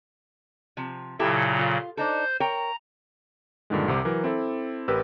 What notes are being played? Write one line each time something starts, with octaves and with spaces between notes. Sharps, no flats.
C3 F3
A#2 C#3 F#3 E4 G4 A4
F4
D4 D#4 A4 C5 G6
A#4 C#5 G5 A#5
G2 A#2 D3 D#3 G#3
C2 C3 D6
E3 F#3 A#4
C4 E4 A4
A1 G4 A#4 B4 E6